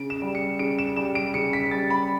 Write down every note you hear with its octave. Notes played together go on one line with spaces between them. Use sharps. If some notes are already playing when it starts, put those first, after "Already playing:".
Already playing: C#3 D7
E7
G3
C#7
C#3 D7
E7
G3 E7
D7
C#3 C#7
B6
G3 A6
B5